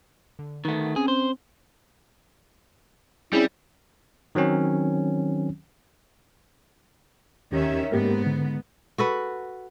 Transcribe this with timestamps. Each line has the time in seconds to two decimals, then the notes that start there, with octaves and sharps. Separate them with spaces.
0.39 D3
0.65 D#3 A3 B4 F#5
0.96 C4 C#4 G#4
1.08 C5
3.33 G3 C4 C#4 E4 G#4
4.35 D#3 F#3 C4 C#4
7.52 D#2 D#3 C#4 G4 E5
7.92 G#2 A#3 B3 G4 A#4
8.26 D3
8.98 F#4 A4 B4